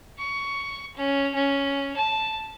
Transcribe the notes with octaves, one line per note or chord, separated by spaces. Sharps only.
C#6
C#4
C#4
A5